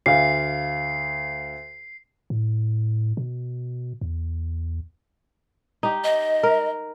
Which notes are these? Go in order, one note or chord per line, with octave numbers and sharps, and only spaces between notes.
D2 F5 C7
A2
B2
E2
D#4 G4
D#5
A#4